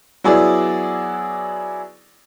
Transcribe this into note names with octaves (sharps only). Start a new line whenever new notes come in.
F#3 B3 E4 G#4 D5